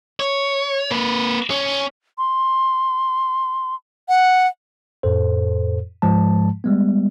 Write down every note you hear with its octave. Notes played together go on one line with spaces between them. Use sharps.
C#5
A#3 B4
C#4
C6
F#5
F2 A2 A4 C5
G#2 F3 G#3 A5
G3 G#3 B3